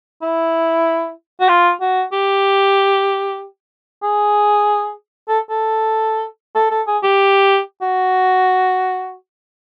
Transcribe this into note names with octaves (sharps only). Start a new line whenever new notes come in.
E4
F#4
F4
F#4
G4
G#4
A4
A4
A4
A4
G#4
G4
F#4